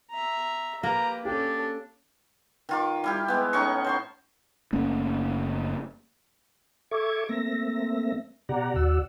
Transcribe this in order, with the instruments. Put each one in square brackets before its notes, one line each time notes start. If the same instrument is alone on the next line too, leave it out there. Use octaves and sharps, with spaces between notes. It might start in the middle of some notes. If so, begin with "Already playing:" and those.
[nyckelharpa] E5 A#5
[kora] A#3 [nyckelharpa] G4 B4 [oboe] A#5
[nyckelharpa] C#4 A4 [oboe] D4 [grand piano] G4
[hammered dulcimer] D#3 F4 D6
G3 E4 G4
G#3 B3
A2 C#4 D#4 C#6
C5 C6 C#6
[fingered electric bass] F#1 A3 A#3 C#4
[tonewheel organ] A4 E5 C#6 D6 G#6
A3 A#3 C4 E5 A#6
B2 G4 D5 F#5 A#5
D#2 F#4 D5 F#5 E6